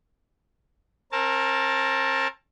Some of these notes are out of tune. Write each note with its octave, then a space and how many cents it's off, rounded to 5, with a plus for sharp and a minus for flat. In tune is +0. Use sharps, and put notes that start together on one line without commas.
C4 +45 A#4 +0 A5 +0